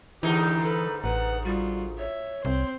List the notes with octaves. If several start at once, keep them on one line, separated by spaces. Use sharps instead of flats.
G#2 D3 E3 D#4 E4 G4 G#4
A4 B4
A1 B4 F#5
G3 F4 F#4
C#5 E5
C2 C4 C5